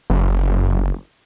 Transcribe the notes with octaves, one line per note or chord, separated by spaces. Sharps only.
F#1